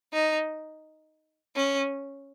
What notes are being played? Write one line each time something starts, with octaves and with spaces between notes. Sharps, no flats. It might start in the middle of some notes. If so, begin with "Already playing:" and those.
D#4
C#4